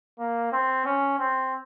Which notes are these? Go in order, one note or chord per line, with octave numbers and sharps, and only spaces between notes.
A#3
C4
C#4
C4